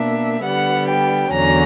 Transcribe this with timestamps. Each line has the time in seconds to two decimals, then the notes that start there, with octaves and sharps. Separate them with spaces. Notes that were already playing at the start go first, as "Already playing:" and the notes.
Already playing: B2 A#3 D4 E5
0.43 D3 G3 B3 F#5
0.88 G5
1.31 E2 D3 F#3 C#4 A#5